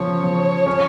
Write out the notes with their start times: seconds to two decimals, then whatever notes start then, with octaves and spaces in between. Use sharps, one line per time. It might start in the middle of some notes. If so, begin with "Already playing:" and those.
Already playing: C#3 F3 C#5
0.24 F3
0.66 C#4